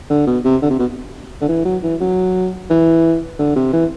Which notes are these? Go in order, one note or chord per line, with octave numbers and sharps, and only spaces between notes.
D3
B2
C3
D3
C3
B2
D3
E3
F#3
E3
F#3
E3
D3
C3
E3